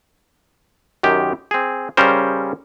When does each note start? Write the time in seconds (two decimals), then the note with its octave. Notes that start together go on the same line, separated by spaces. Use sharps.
1.03 F#2 D#3 G4
1.51 C4 G#4
1.97 C#3 G3 C#4 A#4 C5